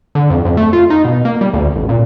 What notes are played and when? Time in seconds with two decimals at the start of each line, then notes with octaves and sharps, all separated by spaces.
0.15 D3
0.30 F2
0.45 F2
0.57 A3
0.73 F4
0.90 D#4
1.05 B2
1.25 A#3
1.41 G3
1.54 D2
1.75 A1
1.89 A#2